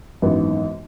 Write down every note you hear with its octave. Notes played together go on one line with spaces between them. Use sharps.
G#1 F#2 E3 B3 D#4